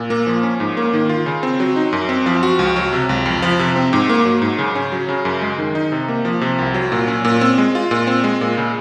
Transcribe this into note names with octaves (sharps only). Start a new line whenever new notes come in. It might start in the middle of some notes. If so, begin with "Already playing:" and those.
Already playing: A#2
A#3
F3
C#4
G#2
A#3
D#3
F4
C#3
C4
F#3
D#4
F#2
C4
F3
F#4
C#2
F#3
C3
C#2
F2
F3
C3
C4
G#2
A#3
F#3
G#2
C#3
C#4
F#3
C#3
F#2
G#3
D#3
D#4
C3
A#3
F3
C3
C2
F#3
A#2
C#4
A#2
C4
G#3
F4
A#2
C4
G#3
A#2
C#3